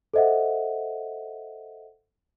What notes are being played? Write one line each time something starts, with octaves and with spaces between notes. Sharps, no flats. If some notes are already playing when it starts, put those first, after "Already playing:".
A4 C5 D#5 E5 F#5